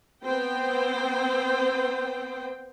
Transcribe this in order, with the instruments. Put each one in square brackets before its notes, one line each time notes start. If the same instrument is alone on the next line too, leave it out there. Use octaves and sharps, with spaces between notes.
[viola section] B3 C4 C5 G5